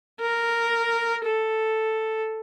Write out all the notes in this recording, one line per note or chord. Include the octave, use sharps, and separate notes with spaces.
A#4
A4